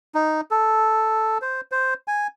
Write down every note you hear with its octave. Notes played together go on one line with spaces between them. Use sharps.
D#4
A4
C5
C5
G#5